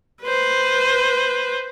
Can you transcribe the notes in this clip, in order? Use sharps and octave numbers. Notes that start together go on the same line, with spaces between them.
B4 C5